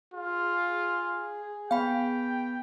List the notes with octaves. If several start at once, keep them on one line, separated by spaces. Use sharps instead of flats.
F4 G#4
B3 F5 G5 B5